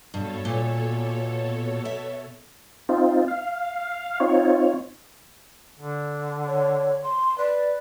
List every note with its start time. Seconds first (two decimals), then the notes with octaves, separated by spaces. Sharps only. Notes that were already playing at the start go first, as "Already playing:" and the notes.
0.14 G2 B2 A4 C#5
0.45 A#2
1.85 E5
2.89 C4 D#4 F4
3.28 F5
4.20 C4 D#4 F4 C#5
5.79 D3
6.47 C#5
7.04 C6
7.38 B4 D5